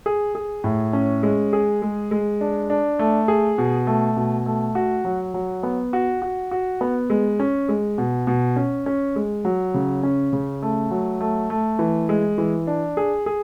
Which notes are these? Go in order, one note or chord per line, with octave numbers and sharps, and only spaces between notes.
G#4
G#4
A2
C#4
G#3
G#4
G#3
G#3
D4
D4
A3
G#4
B2
A3
B2
A3
F#4
F#3
F#3
B3
F#4
F#4
F#4
B3
G#3
C#4
G#3
B2
B2
C#4
C#4
G#3
F#3
C#3
C#4
C#3
A3
F#3
A3
A3
E3
G#3
E3
D4
G#4
G#4